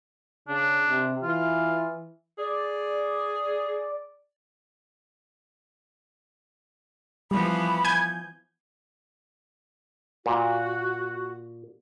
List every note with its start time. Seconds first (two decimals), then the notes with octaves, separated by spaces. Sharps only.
0.48 C#3 D4
0.89 C3
1.23 E3 F4
2.38 G#4 D5
7.31 E3 F3 G3 B3 B5
7.85 G#5 G6 G#6
10.26 A#2 F#4